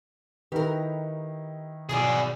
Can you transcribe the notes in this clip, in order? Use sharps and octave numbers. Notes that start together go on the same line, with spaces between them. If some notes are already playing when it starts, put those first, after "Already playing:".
D#3 D#4 E4 G4 A#4 B4
E2 G#2 B2 F#3 G#4 D5